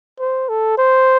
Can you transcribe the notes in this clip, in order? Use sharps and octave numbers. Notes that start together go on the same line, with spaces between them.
C5
A4
C5